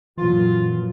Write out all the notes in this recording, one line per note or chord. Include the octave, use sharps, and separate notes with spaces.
F#2 A#2 E3 F4